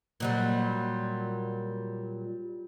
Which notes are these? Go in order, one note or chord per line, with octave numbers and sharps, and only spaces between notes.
A#2 F#3 G3